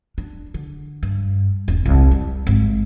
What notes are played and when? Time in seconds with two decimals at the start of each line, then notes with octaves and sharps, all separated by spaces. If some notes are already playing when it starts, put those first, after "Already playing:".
0.18 D4
0.54 D3
1.03 G2
1.68 D#1
1.86 C2
2.11 G3
2.47 G#1